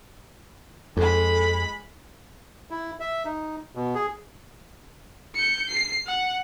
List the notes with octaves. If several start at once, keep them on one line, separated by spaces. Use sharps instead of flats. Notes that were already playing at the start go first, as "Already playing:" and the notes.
F2 G#3 A4 B5
E4
E5
D#4
B2
G#4
G6 C#7
C7
F#5